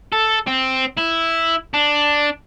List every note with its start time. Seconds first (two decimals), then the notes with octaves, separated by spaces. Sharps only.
0.12 A4
0.47 C4
0.98 E4
1.74 D4